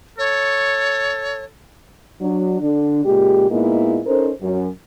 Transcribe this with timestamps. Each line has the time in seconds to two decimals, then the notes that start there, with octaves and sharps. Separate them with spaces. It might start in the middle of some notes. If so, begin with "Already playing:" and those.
0.18 A4 C#5
2.21 F#3 D4
2.61 D3 D4
3.05 A#2 C#3 G#3 G4
3.50 A#2 G#3 A#3 B3 D#4 E4
4.06 C#4 D#4 A4 A#4 C5
4.41 F#2